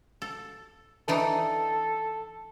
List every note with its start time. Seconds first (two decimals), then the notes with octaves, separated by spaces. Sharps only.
0.22 A4
1.08 E3 D4 D#4 A4